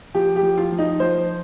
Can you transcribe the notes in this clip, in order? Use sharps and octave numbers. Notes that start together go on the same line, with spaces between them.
F3 G4
G4
F3
F4
F3
D#4
F3 C5